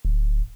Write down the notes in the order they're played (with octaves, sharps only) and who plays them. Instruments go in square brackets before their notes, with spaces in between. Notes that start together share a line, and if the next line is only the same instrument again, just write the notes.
[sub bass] D1